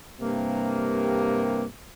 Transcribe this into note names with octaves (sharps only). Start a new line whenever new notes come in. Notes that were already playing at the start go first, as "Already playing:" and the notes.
G2 C3 A#3